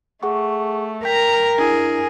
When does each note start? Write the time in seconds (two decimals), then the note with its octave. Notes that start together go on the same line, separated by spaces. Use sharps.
0.23 A3 G#4 F#5 C#6
1.05 A#4 G5 A#5 G6 B6
1.59 D4 E4 G#4